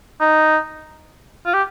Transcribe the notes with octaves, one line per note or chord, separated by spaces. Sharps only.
D#4
F4
G4